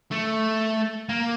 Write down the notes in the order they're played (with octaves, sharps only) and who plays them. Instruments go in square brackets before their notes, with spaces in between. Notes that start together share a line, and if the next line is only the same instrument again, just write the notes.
[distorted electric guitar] A3
A#3